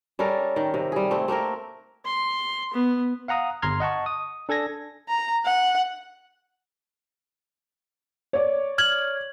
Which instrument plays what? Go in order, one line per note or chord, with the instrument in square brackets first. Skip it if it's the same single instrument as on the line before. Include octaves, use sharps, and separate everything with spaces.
[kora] G3 C#4 A4 A#4
D#3
C3
G3 G#4
A3 C4
A3 A#3 C4 A#4
[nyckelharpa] C6
B3
[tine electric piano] F5 F#5 A#5 D#6
G1 A#5 C6 F6 G#6
D#5 F#5 A5 C#6
D#6
D4 A4 G#5 G#6 A#6
[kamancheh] A#5
F#5
[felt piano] C#5 D5
[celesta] F6 G#6 F#7